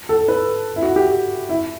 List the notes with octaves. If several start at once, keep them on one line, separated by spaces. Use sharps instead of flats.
A4
B4
E4
F#4
G4
E4